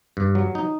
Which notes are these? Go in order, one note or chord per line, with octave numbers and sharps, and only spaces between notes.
G2
F#3
D#4